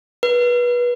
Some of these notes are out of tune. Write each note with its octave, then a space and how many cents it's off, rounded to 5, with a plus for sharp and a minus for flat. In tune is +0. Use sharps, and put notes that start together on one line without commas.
B4 -25